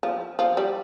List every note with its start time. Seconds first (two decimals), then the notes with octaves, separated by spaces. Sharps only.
0.03 F3
0.39 F3
0.57 G3